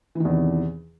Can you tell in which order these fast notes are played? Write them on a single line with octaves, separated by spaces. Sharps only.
E3 D#3 E2 C3